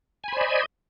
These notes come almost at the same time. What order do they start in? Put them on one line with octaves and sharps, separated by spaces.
G#5 B5 C5 D5 D#5